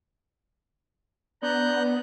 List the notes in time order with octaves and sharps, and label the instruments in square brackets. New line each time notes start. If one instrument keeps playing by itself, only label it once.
[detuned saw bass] B3 [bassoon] D4 [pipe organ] A#5 F#6 G6